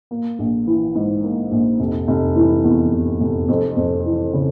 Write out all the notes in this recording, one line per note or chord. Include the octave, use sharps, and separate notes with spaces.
A#3
A#1
E3
G#2
A#3
A#1
F1
F1
E3
E2
F1
F1
F2
F2
E3
C#3